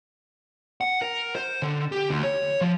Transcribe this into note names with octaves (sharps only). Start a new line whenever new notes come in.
F#5
A#4
C5
D3
G4
D2
C#5
F3